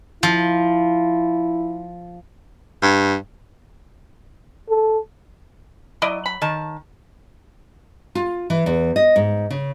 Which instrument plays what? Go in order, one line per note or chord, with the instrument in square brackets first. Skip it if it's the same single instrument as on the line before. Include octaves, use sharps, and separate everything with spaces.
[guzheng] F3 [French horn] E4
[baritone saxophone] G2
[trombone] A4
[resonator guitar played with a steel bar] F#3 [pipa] E4 D5 D#5
[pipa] B5
[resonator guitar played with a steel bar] D#3 A5
[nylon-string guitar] F4
E3
E2
D#5
G#2
C#3